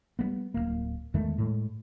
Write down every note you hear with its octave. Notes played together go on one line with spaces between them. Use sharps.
G3 A3 B3
D1 A#1 A#3
E2 D#3 G#3 A3
A2 G#3